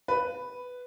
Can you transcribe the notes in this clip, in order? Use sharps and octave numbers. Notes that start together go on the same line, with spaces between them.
B4